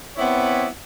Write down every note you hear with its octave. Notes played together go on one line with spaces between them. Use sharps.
B3 C4 E4 C#5 D5